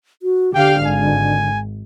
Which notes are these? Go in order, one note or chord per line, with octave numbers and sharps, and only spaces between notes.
F#4
D3 G4 F5 G5
G#1 G#5